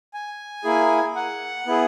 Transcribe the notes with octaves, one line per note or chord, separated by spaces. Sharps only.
G#5
A#3 E4 G#4
F#5
B3 E4 G#4